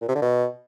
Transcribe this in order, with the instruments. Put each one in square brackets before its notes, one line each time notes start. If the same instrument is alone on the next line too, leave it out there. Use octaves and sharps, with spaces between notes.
[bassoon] A#2
C3
D3
B2